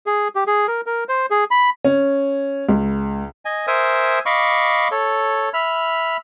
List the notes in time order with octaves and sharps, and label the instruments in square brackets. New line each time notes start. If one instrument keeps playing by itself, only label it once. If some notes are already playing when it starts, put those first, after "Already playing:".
[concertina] G#4
G4
G#4
A#4
A#4
C5
G#4
B5
[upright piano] C#4
C#2
[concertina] D#5 G#5
A#4 C5 E5 G#5 D#6
D#5 F5 B5 C#6 D6
A4 C#5
E5 B5 F6